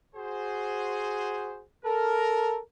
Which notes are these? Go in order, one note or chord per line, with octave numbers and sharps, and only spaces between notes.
F#4 G#4 C5
A4 A#4